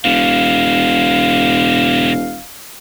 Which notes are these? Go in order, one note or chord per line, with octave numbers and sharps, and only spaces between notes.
E1 B2 D3 F5